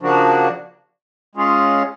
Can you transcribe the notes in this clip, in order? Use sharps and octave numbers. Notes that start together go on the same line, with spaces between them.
C#3 F3 A#3 D4 F#4
G#3 C#4 F4 G#4